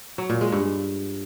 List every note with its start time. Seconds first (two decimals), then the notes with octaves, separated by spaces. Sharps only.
0.18 F#3
0.30 A#2
0.41 G#3
0.52 G2